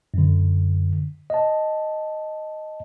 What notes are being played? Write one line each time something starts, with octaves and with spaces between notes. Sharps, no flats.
F#2 D3
D#5 A5